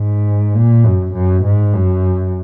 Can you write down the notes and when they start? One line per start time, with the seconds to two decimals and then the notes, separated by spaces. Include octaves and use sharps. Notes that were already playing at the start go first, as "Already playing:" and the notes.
Already playing: G#2
0.54 A#2
0.84 F#2
1.14 F#2
1.44 G#2
1.74 F#2